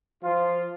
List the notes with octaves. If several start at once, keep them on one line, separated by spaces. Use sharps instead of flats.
F3 F4